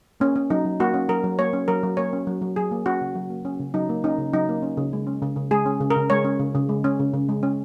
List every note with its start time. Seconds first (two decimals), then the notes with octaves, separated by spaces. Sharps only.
0.20 A#3 C#4
0.36 C#4
0.50 F#3 D#4
0.65 F#3
0.80 A#3 F#4
0.94 C#4
1.09 F#3 A#4
1.24 F#3
1.39 A#3 C#5
1.53 C#4
1.68 F#3 A#4
1.83 F#3
1.97 A#3 C#5
2.13 C#4
2.27 F#3
2.42 F#3
2.56 F#3 G#4
2.71 A#3
2.86 C#4 F#4
3.01 C#3
3.15 F#3
3.30 A#3
3.45 C#4
3.60 C#3
3.74 F#3 D#4
3.89 A#3
4.04 C#4 D#4
4.18 C#3
4.33 F#3 D#4
4.49 A#3
4.62 C#4
4.77 C#3
4.93 G#3
5.07 C#4
5.22 C#3
5.36 C#3
5.51 G#3 G#4
5.66 C#4
5.81 C#3
5.90 A#4
5.96 C#3
6.10 G#3 C#5
6.24 C#4
6.39 C#3
6.55 C#3
6.69 G#3
6.84 C#4
6.99 C#3
7.14 C#3
7.29 G#3
7.43 C#4